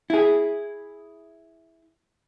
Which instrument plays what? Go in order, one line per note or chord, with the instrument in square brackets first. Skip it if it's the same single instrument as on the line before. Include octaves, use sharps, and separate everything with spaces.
[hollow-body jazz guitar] E4 G#4